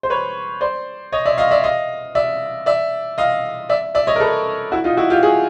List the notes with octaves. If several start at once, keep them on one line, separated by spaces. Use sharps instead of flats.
C5
B4 C#5
C5 D5
C#5 D#5
D5 E5
D#5 F5
D5 E5
D#5 F5
D5 E5
D5 E5
D#5 F5
D5 E5
D5 E5
C#5 D#5
A#4
A4 B4
E4 F#4
D#4 F4
E4 F#4
F4 G4
F#4 G#4